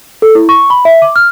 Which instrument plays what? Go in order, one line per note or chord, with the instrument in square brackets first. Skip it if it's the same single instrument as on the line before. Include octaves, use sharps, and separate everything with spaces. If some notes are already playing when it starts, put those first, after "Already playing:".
[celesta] A4
E4
C#6
B5
E5
D6
F6